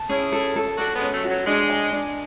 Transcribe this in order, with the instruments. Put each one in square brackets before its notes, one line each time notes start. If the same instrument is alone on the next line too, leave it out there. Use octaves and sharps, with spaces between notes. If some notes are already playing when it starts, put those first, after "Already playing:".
Already playing: [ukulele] A5
[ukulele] C#4 [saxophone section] E4 G#4
[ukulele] A4
A4
[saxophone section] D4 F#4 [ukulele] A4
[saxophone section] G#3 B3
[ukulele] C#4
[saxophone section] F#3 A3
[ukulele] F#4
[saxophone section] F#3
[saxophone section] G#3 [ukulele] D4
[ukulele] G#5
D4